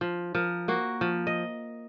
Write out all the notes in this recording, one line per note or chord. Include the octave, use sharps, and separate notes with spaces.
F3
F3 A#4
A#3 F#4
F3
D#5